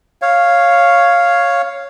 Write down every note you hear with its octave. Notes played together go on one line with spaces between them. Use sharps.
C#5 F5